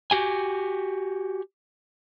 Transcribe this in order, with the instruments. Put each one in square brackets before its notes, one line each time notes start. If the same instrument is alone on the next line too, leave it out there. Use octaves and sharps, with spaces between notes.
[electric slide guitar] F#4 G4 G#5